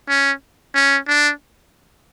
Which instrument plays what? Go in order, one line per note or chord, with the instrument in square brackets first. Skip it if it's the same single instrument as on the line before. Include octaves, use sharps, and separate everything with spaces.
[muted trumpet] C#4
C#4
D4